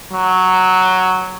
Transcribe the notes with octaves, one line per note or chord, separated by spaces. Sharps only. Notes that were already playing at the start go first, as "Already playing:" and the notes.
F#3